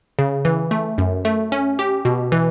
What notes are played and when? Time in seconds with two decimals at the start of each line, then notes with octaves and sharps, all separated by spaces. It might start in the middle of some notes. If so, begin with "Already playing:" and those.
0.19 C#3
0.45 E3
0.71 A3
0.98 F#2
1.25 A3
1.52 C#4
1.79 G4
2.05 B2
2.32 E3